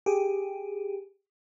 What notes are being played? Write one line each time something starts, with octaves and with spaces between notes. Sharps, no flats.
G4 G#4